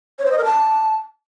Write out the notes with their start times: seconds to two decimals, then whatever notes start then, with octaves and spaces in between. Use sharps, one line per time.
0.19 C#5
0.25 C5
0.32 D#5
0.38 A#4
0.44 A5